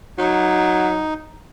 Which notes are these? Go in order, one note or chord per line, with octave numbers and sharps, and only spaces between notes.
F#3 D#4